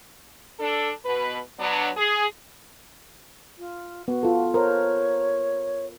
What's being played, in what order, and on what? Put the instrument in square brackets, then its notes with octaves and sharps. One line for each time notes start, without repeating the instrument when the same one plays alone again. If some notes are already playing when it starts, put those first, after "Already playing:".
[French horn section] D4 A4
B2 B4
F#3 B3 D4
G#4
[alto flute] F4
[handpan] B3 [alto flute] F#4
[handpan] F4 A4
[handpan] A#4 C5 [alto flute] C#5